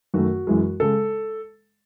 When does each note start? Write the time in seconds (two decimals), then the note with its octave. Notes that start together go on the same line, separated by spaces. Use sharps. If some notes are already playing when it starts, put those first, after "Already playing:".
0.14 F#2 D#3 A3 F#4
0.47 F#2 E3 G#3
0.80 C#3 G#3 A4